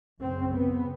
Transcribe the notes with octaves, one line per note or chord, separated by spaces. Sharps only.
F#2 C#3 C4
B3